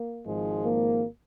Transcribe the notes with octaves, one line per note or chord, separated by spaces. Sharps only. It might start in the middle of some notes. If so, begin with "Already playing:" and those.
Already playing: A#3
G#1 G#2 F3 G#3
A#3